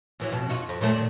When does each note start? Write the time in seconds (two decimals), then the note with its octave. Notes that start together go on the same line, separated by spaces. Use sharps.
0.20 E2 E3 F#3
0.32 F2 B2
0.50 D#4 F4 F#4
0.69 F2
0.81 A#2 F#3 A3
0.94 D#3 D5